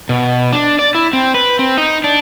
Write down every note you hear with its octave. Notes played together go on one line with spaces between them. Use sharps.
B2
D4
D5
E4
C4
B4
C4
D#4
D4